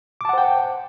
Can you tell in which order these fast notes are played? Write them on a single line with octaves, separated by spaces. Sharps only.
D6 A5 F#5 C5 G5